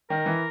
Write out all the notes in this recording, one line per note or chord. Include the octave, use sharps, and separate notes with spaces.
D#3 A#4
E3